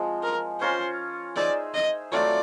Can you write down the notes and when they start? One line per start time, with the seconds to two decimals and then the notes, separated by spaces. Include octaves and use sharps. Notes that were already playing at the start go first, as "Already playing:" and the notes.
Already playing: F3 G#3 C4
0.23 A#4
0.61 C#4 F4 A#4 C5
1.36 D#4 G#4 C5 D5 E5
1.74 D#5
2.12 F#3 A3 C4 F4 D5